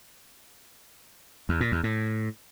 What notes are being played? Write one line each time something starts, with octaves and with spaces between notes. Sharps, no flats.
E2
A#2
E2
A2